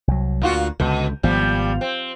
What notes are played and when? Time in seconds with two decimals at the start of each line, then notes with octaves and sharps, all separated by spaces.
0.08 C2 F#3
0.42 D2 A#2 F4 F#4
0.80 C#2 B2 D3
1.23 G#1 F3 G3 B3
1.81 C4